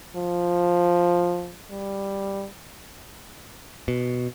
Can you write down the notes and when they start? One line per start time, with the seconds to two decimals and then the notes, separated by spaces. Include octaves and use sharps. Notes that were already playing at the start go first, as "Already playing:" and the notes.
0.16 F3
1.71 G3
3.88 B2